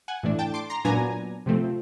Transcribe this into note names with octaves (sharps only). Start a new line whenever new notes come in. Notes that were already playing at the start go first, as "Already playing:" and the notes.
F#5 G#5
A2 E3 A3 D4
G5 A5
C6 D6
A#5 C6
A#2 F#3 B3 D4 G#5 A#5
C3 F3 A3 C4